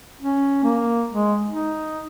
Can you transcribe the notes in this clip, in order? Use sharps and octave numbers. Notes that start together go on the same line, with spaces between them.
C#4
A#3
G#3
D#4